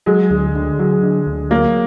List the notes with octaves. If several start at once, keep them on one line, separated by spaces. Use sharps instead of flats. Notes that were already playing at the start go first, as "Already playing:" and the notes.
F#3 G#3
D2
D3
F#3
D3
D2
F#3 A#3